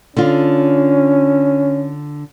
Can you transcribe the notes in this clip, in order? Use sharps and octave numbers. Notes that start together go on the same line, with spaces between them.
D3 C#4 F4